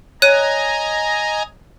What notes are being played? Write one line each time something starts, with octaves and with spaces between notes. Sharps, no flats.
C#5 D#5 G#5 A#5 F#6 D#7